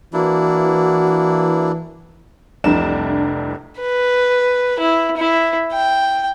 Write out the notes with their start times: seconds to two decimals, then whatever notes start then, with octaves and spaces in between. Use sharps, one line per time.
0.13 E3 A#3 D4 E4 F#4
2.64 F1 C2 E3 D4 E7
3.80 B4
4.79 E4
5.17 E4
5.73 G5